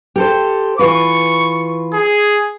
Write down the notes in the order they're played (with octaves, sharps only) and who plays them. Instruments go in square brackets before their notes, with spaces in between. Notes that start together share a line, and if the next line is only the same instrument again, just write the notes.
[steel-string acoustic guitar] G4 A4 C5
[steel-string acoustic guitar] E3 F4 B4 [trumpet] C#6
[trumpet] G#4